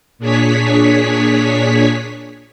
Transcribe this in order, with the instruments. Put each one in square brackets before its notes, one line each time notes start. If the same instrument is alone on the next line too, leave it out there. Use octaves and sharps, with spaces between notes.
[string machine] A#2 D4 G#4 C#5 B6